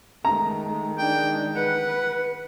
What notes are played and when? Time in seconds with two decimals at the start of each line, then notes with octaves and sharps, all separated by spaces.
0.25 D#3 G#3 A3 A#5
0.98 D4 D#4 G5
1.56 B4 F#5